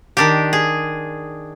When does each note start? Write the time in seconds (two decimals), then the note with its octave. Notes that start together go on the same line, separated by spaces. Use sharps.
0.17 D#3 D4 G4
0.53 G#4